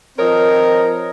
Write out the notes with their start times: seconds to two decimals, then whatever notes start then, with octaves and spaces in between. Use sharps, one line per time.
0.18 F3 C4 A#4 C#5 D#5